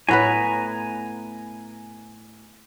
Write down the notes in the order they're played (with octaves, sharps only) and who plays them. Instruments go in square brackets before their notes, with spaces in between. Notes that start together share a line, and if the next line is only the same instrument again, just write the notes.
[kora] A2 B3 B4 [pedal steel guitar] G#5 A#5